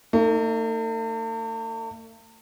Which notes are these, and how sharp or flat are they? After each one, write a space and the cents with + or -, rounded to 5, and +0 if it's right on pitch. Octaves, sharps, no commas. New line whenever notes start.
A3 +45 D#4 +0